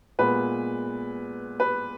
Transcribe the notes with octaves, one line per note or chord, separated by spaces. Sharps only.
A#2 G#3 B3 B4
B4